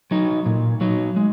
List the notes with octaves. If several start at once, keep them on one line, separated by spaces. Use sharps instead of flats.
F#3 D#4
A#2
F#3 D#4
G#3